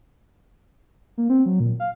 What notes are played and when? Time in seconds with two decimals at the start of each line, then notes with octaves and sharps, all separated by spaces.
1.18 A#3
1.30 C4
1.46 F#3
1.60 A#2
1.80 F5